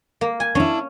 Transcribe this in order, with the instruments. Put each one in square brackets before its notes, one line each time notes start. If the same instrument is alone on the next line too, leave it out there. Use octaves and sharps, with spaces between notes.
[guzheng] A#3
G#5
[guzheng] C#4 [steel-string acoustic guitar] D4 E4